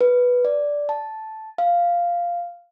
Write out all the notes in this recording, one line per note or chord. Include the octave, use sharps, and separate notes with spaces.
B4
D5
A5
F5